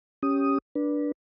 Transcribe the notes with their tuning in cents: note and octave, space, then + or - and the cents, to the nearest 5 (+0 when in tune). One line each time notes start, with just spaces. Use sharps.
C#4 +0 G4 +0 D#6 +0
D4 +0 B4 -30